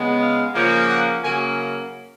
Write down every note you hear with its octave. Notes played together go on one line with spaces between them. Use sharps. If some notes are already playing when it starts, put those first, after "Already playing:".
Already playing: C#3 G#3 B3
F5
C#3 F3 A#3
F#5
C#3 F#3 A#3 C#4 G#5